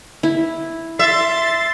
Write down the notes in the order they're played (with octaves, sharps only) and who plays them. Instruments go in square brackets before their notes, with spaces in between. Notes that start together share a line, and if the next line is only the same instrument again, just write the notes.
[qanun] E4
[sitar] E5 [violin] C6 A6